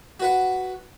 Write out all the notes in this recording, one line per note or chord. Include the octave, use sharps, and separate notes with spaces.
F#4 B4 F#5